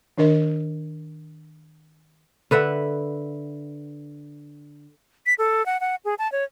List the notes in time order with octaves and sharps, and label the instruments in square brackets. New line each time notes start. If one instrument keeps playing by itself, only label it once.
[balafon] D#3 D4 A#4 D#5
[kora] D3 B4 E5 F#5
[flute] B6
A4
F#5
F#5
G#4
A5
C#5